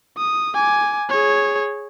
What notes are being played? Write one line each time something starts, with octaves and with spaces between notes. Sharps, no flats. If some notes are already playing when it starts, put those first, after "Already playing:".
D#6
G#5 D6
G#4 C#5